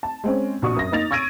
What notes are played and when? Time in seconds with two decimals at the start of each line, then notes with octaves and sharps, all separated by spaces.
0.03 A5
0.24 G#3 C4 C#4
0.62 A#1 F#4 C#6 D#6
0.76 F#2 A#6
0.92 A#3 D#4 A6 F7
1.11 C#6 E6 G#6 A#6 D7 D#7